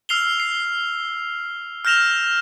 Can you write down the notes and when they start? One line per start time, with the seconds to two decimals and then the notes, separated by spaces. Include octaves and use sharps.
0.09 E6 F6 C7 F7 G7
0.40 C7
1.85 F6 G6 A#6 E7 F7